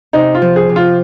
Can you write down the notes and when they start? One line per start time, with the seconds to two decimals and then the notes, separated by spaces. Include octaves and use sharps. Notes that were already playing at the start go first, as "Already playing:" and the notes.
0.13 C3 D#4
0.35 F4
0.42 F3
0.56 G#4
0.69 C3
0.76 F4